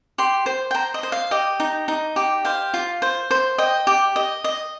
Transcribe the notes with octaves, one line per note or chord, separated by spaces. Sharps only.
G4 C6
C5
G5
C5 A#5
D#5
C5
F5
G4 D#5
D#4
D#4
G4
C5 F5
F4
C5
C5
D#5 G5
G4
D#5
D#5